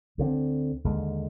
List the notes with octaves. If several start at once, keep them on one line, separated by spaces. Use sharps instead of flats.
D2 D3 F3 C4
D#2 D3 G#3